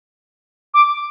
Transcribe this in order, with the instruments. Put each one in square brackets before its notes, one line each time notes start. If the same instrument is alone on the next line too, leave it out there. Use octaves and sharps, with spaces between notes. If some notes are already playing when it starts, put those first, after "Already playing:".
[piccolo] D6